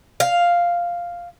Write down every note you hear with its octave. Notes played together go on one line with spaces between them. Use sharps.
F5